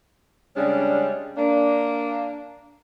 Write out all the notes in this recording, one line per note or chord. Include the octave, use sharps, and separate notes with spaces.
C#3 G3 G#3 C#4 D4
A#3 D4